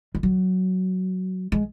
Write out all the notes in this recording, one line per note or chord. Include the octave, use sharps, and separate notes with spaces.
G#3
F#3
G#3